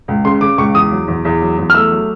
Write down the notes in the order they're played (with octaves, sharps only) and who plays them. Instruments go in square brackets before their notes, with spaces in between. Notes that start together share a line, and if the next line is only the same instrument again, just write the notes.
[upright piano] C#2
[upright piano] C#3 [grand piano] C6
[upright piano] C#3 [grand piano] D6
[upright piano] C#2 [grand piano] C#6
[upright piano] E2 [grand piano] D#6
[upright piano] F#3
E2
E2
F#3
E2
[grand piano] F6
[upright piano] A3 [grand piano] E6
[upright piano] F#3